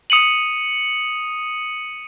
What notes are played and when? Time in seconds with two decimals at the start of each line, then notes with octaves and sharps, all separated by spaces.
0.10 D#6 C#7 D#7 F#7